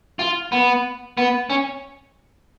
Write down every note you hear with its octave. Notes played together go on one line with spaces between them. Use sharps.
F4
B3
B3
C#4